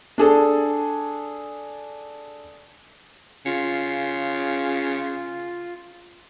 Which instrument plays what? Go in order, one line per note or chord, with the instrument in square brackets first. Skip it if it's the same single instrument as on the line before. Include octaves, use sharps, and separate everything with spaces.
[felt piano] D4 G#4 A4 A5
[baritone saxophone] C#3 [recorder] F4